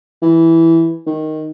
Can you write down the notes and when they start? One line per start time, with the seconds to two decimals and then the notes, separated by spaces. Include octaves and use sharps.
0.22 E3
1.07 D#3